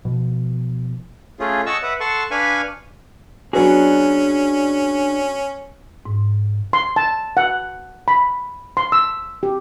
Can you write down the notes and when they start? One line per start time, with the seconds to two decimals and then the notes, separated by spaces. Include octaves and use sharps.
0.05 B2 F3
1.39 A3 C#4 F4 G#4
1.66 C#5 D#5 F#5 A5 C#6 E6
1.83 B4 E5 F#5
2.00 A4 F#5 A5 C6 C#6
2.31 D4 B4 F5 G#5 B5 C#6
3.53 F#3 B3 C#4 D4 F#4 G#4
6.06 G#2
6.73 C6
6.96 A5
7.37 F#5
8.08 B5
8.77 C6
8.92 E6
9.43 G4